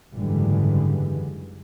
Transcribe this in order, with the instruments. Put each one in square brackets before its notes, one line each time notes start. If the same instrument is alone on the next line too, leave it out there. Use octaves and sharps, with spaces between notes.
[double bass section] F#1 G#2 D3 E3 G3 G#3